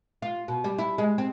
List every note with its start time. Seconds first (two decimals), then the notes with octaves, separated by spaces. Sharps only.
0.22 F4
0.48 B2
0.64 G3
0.78 E4
0.98 G#3
1.18 C4